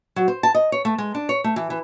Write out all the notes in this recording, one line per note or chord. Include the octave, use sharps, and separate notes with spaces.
F#3
C5
A5
D#5
C#5
A3
G#3
D4
C#5
A3
E3
E3